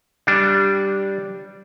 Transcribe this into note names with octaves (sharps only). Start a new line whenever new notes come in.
G3 D4